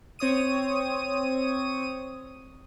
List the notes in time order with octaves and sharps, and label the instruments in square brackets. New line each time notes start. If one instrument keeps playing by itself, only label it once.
[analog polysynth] C4 C#5 D#6 D#7